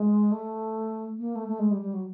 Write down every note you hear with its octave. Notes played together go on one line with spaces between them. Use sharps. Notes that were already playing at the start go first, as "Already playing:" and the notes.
Already playing: G#3
A3
A#3
A3
A3
G#3
G3
G3
F#3